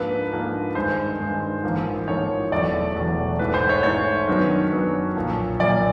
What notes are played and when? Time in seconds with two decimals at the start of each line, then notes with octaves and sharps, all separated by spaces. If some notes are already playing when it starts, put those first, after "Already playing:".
Already playing: G#2 F3 A#3 D4 B4
0.31 G#2 F3 A#3 D4
0.75 G2 D#3 G#3 C5
1.20 G2 D#3 G#3
1.63 A1 G#2 F3 A#3
2.07 A1 G#2 F3 A#3 C#5
2.52 E1 E2 B2 F#3 A3 D5
2.95 E1 E2 B2 F#3 A3
3.39 G#2 E3 A3 B4
3.54 C5
3.69 C#5
3.83 G#2 E3 A3 C#5
4.28 F#2 D#3 F#3 B3 D4
4.71 F#2 D#3 F#3 B3 D4
5.16 B1 A#2 F3 A#3
5.60 B1 A#2 F3 A#3 D5